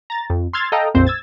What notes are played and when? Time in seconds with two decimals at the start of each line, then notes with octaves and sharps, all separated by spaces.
0.10 A#5 A6
0.30 F2
0.53 C6 E6 F6 G#6 A6
0.72 A4 D#5 F5 G5 A#5
0.94 A#1 F2 C4 C5
1.07 E6 G#6 A6